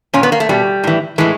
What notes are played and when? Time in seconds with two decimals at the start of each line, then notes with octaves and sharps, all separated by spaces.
0.14 A#2 C#4
0.23 B3
0.32 A#3
0.40 A3
0.49 B2 G3
0.84 A2 E3
1.18 A2 E3 G#3